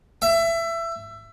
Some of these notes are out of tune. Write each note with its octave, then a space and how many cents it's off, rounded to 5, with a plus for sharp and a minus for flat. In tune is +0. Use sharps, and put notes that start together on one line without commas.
E5 +20